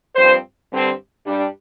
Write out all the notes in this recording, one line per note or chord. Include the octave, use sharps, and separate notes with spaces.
G2 F3 C4 C5
G2 D3 G3 C4
G2 G3 D4